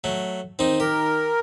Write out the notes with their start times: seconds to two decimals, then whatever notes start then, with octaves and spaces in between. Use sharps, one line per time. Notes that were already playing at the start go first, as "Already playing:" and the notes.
0.04 F#3 A3
0.59 D#3 C4 D#4
0.80 G4 A#4